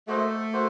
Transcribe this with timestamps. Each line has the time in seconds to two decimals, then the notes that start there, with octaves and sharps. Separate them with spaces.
0.08 A3 A#3 F#4 C5 D#5
0.52 A#3 F#4 C5